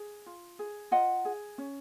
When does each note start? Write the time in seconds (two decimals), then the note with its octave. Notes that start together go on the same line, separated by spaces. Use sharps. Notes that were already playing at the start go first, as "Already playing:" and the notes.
Already playing: G#4
0.26 F4
0.59 G#4
0.91 F4 D#5 F#5
1.25 G#4
1.58 C#4